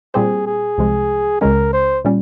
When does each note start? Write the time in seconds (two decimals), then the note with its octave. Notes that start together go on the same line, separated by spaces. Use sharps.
0.14 A#2 G3 C4 G4 G#4 C5
0.47 G#4
0.78 C2 C3 F3 G#3
1.41 C#2 C#3 G#3 C#4 A#4
1.73 C5
2.05 A#2 G3 C#4